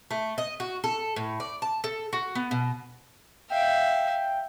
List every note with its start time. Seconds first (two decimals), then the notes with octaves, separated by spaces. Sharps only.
0.11 A3
0.38 D#5
0.60 F#4
0.84 A4
1.16 A2
1.40 D5
1.62 A5
1.84 A4
2.13 F#4
2.35 B3
2.51 B2
3.50 E5 F5 G5